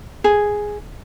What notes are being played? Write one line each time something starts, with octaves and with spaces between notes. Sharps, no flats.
G#4